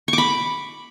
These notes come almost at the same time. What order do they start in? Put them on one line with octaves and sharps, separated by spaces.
C#6 D6 B5